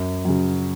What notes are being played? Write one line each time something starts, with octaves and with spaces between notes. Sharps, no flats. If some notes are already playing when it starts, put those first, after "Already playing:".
Already playing: F#2
C#3 F#3